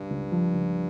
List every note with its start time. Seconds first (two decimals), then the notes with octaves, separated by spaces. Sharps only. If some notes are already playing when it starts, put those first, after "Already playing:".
Already playing: C#2 G2
0.11 C#2
0.32 F3
0.54 C#2